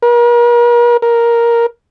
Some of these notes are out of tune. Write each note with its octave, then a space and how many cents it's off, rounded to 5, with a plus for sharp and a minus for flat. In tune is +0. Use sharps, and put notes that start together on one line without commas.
A#4 +40
A#4 +5